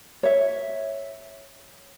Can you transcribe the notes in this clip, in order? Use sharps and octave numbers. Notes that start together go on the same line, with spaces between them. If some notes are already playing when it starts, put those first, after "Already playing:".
C#5 E5